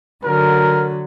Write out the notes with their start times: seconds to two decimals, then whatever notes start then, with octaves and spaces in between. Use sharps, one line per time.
0.24 D3 F#3 A#4